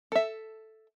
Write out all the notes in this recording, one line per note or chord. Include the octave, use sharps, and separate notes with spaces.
A4 E5